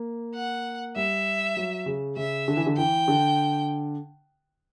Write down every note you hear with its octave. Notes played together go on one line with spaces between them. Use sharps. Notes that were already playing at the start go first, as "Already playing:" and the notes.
Already playing: A#3
F#5
G3 E5
F#3
C#3
C#3 E5
D3
E3
D3
E3 G5
D3